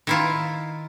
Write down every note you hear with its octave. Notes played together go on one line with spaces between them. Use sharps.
D#3 E4 F4